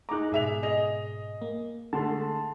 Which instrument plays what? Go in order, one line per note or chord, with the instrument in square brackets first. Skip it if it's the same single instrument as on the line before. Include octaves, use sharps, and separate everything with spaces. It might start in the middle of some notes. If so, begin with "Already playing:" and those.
[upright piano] D#4 G#4 D6 [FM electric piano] A#5 F#6
[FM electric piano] G#2 B2 [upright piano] G#4 E5 F7
[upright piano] G#4 D#5 F7
[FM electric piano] A#3
[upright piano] D3 G#3 A3 [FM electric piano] A5 C6